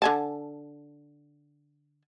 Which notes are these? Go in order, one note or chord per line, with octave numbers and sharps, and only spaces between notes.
D3 G#5 A5